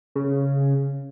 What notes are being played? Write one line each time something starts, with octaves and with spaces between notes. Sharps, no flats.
C#3